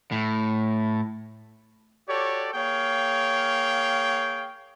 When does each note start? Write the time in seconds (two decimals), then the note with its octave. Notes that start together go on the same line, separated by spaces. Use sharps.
0.12 A2
2.09 F#4 G4 A4 C#5 D5
2.54 A#3 G#4 C#5 F5 G5